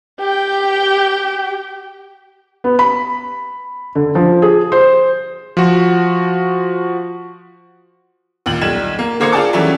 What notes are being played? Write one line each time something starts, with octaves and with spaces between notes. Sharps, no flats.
G4 G5
B3
B5
D3
F3
G#4
C5
F3 F#4
D#2 A#2 F#7
B1 G3 G#6 E7
A#3
D3 A#3 C5 D6 G#6 C#7
F4 G#4 D5 G5 A5 D6
E3 F#3 G3 A3 C#4 E4